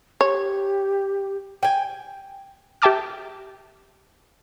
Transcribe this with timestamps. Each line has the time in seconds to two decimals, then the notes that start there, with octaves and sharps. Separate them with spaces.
0.21 G4 C#5
1.63 G5 G#5
2.82 G4 E5 G5 A5 D6 F6